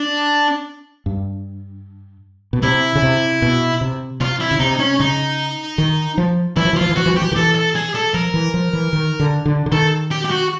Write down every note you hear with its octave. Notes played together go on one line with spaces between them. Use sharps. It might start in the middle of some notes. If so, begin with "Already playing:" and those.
Already playing: D4
G2
B2
C3 E4
C#3
C3
B2
C3
C3 F4
E4
C#3
C3 D#4
C#4
C#3 D#4
D#3
F3
E3 E4
F3
E3
F3 F4
E3
F3 F#4
E3
F3 G4
E3
D#3
E3 A4
A4
G#4
A4
F3 A#4
E3
F3
E3
D#3
D3
D3
D3
D#3 A4
G4
G4
F#4